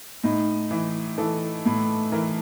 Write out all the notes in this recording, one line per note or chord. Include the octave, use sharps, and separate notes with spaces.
A2 D#4
E3
E3 A4
A2
E3 A#4